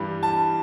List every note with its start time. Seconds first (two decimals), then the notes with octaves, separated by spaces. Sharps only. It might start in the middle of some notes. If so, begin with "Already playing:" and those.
Already playing: G2 E3 G3
0.23 A5